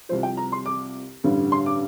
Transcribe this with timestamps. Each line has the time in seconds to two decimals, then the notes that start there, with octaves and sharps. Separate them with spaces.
0.09 C2 C3 F3 C5
0.23 G5
0.37 A#5
0.52 C6
0.66 D6
1.24 A1 G2 D3 G3
1.52 C6
1.66 D6